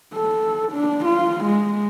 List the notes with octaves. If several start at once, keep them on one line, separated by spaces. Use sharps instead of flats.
A4
D4
F4
G#3